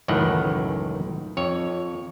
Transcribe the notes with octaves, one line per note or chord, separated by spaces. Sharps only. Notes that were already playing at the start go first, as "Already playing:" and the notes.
C#2 F#2 A2 D#3 E3 F#5
F2 C#5